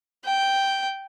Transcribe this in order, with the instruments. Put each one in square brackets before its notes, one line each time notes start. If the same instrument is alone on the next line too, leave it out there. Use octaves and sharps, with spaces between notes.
[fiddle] G5